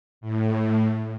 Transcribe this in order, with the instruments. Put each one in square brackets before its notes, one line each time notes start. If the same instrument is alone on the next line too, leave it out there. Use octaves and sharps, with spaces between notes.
[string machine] A2